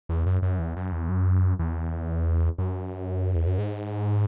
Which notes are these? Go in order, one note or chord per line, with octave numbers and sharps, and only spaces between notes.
E2
F#2
F#2
E2
F#2
E2
F#2
E2
F#2
E2
F#2
G#2